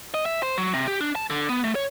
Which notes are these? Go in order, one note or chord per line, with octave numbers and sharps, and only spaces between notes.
D#5
E5
C5
F#3
C3
G4
D4
A5
D3
B3
A3
C#5